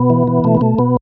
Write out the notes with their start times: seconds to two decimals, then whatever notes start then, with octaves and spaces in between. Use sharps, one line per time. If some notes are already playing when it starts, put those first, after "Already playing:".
Already playing: B2 B3
0.10 E3
0.27 E3
0.44 B2 A3
0.55 B3
0.61 B2 A3
0.78 B2 B3